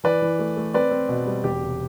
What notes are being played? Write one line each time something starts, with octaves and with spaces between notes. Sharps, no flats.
E3 B4 D5
E3
A3
A3
C4 B4 D5
C4
B2
G3
E1 G4
C3